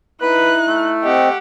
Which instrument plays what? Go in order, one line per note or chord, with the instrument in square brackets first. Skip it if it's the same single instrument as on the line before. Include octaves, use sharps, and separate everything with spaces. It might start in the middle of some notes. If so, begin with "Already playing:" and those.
[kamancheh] D#4 F#6 [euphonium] E4 [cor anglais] B4
[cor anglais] A3
[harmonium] C4 D#5 [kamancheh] G4 F#5